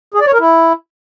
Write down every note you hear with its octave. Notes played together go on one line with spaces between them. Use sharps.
G#4
D5
C#5
A#4
E4